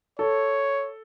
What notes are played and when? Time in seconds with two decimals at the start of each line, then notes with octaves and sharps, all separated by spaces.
0.19 A4 C#5